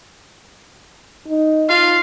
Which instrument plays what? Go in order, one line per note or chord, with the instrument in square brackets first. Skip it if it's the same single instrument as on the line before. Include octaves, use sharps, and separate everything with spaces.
[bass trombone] D#4
[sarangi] F4 [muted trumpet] F5